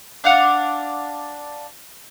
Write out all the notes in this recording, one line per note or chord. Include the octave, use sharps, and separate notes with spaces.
D4 F5 F#5